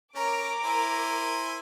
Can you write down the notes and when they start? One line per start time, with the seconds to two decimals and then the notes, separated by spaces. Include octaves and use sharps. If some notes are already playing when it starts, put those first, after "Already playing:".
0.16 C#4 A#4 A#5 D6
0.63 E4 C5 G#5